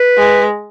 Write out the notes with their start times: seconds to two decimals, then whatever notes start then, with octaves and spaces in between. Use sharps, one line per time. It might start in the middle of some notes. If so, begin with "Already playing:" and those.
Already playing: B4
0.17 G#3